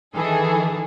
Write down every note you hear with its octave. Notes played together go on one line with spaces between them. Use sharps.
D#3 E3 G#4 A4